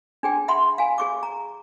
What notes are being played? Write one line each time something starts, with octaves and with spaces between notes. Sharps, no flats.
D4 G#4 G5
E5 F#5 B5 C6
F5 G#5
G#4 C#6 D6
A#5